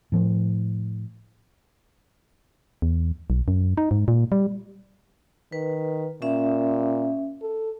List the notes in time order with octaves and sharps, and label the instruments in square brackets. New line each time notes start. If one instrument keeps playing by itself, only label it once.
[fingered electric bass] A2 F3
[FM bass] E2
B1
F#2
D#4
G#2
A#2
G3
[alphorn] D#3 [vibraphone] B4
[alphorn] A#2 [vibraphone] C#4 E5
[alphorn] A4